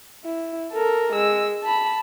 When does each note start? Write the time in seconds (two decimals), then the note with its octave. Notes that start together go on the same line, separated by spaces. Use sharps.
0.24 E4
0.72 A4 A#4
1.13 G#3 E6
1.63 A5 B5